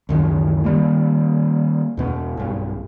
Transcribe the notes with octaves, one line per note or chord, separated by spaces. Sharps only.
C#2 F#2 D#3 E3
D#3 G3 A#3
E2 B2 B3
B1 G2